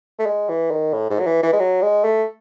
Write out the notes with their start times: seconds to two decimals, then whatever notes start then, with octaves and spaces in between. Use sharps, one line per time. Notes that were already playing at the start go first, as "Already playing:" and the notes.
0.19 A3
0.26 G#3
0.49 E3
0.71 D#3
0.93 A2
1.10 G#2
1.20 F#3
1.26 E3
1.43 E3
1.53 G#3
1.59 F#3
1.82 G#3
2.04 A3